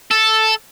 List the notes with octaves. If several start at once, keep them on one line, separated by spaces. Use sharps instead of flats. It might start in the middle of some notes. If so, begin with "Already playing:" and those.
A4